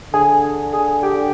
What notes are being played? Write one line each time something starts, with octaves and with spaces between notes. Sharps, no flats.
D3 G#4
G#4
G4